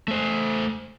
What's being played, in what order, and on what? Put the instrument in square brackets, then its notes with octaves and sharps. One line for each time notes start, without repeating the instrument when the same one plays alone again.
[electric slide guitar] A3 C5